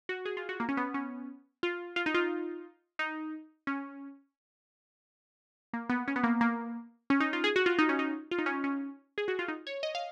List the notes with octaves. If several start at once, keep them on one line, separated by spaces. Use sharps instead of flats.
F#4
G#4
F4
F#4
A#3
C#4
B3
C#4
F4
F4
D#4
F4
D#4
C#4
A#3
B3
C#4
B3
A#3
A#3
C#4
D#4
F4
G#4
F#4
F4
D#4
C#4
D#4
F4
D#4
C#4
C#4
G#4
F#4
F4
D#4
C#5
D#5
F5